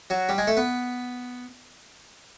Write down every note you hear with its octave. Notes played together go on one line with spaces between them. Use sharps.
F#3 F#4
G3 G4
G#3 G#4
A3 A4
B3 B4